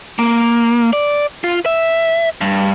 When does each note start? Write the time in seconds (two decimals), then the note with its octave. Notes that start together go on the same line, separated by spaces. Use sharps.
0.19 A#3
0.93 D5
1.44 F4
1.66 E5
2.41 G2